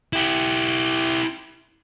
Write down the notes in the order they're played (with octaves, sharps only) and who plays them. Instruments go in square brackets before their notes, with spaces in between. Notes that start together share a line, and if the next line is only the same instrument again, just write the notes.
[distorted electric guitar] E4 G4